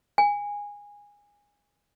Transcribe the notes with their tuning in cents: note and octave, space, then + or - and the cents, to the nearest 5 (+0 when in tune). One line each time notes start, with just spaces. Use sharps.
G#5 -20